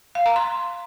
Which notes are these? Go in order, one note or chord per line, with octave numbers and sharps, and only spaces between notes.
F5
A#5
C6